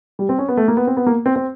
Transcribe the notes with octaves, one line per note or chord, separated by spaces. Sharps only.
G3
C4
C#4
B3
A3
A#3
B3
C4
B3
A#3
C4
C4